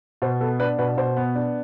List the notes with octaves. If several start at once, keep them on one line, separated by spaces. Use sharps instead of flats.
B2 C5
B3 A4
D4 B4
B2 B4
B2 C5
B3
D4